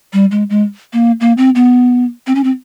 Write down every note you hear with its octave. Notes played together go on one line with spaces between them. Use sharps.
G3
G#3
G#3
A#3
A#3
C4
B3
C4
C#4
C4